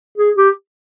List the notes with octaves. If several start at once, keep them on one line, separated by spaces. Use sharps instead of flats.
G#4
G4